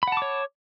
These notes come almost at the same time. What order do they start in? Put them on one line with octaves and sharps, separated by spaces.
B5 F#5 A5 D6 C#5